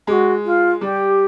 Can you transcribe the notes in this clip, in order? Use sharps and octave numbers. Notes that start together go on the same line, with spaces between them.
G#3 F#4 G4
F4
G3 G4